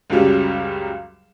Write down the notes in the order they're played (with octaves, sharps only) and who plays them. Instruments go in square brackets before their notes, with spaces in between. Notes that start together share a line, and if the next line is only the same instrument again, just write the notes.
[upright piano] C#2 F#2 C#3 F#3 G3 C#4